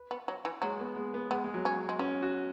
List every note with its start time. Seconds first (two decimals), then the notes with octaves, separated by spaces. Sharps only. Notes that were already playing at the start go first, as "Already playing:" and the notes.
Already playing: B4
0.11 B3
0.28 F#3
0.45 E3
0.62 F#3 G#3
0.80 B3
0.96 G#3
1.14 B3
1.30 G#3 B3
1.44 G#3
1.54 F#3
1.65 C#4
1.89 G#3
1.99 B3 C#4
2.22 F#4